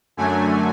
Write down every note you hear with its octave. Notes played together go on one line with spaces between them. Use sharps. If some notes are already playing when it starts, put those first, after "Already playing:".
F#2 D3 F#3 A3 G#5